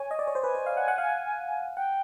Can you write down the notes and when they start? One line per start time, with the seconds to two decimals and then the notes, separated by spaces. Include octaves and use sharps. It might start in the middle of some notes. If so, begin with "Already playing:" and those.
Already playing: C#5 G#5
0.11 D#5
0.19 D5
0.27 C#5
0.35 C5
0.44 B4 G#5
0.55 C5
0.66 F5
0.77 F#5
0.88 F#5
0.98 F5
1.09 F#5
1.76 F#5 G5